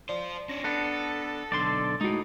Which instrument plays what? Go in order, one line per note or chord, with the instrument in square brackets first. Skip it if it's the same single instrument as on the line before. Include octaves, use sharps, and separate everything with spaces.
[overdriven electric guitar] F4 C5 [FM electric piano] D5
[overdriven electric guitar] C#4 D4 [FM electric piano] A#6
[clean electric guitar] B3 D4 [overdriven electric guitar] A4
[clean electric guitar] B1 D3 C6 [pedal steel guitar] D5
[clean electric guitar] A2 D#4 [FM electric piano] G#3 F#4